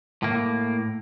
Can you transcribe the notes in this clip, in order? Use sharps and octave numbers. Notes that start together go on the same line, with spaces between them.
A2 A#3